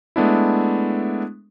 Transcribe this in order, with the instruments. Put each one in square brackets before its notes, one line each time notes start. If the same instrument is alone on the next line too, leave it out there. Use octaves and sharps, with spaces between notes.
[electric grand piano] G#3 A3 B3 D4 E4